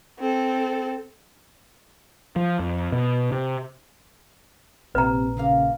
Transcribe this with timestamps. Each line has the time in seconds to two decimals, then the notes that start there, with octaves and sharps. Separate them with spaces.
0.20 C4 A4
2.36 F3
2.59 F2
2.92 B2
3.32 C3
4.95 A#1 C3 B4 A#5
5.37 G#2 C#3 A#3 F5